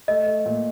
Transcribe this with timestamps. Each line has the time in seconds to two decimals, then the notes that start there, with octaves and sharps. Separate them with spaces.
0.08 A3 D#5
0.26 A3
0.46 A#2